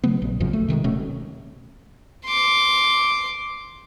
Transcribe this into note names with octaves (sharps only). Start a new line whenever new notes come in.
C#3 F#3 A3 B3
A#1
G#1 F#2 C#3 F3
A3
C3 D#3 G3 G#3
F1 B2 A3 C#4
C6 D6